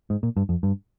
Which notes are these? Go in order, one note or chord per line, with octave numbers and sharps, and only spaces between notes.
G#2
A#2
G2
F2
G2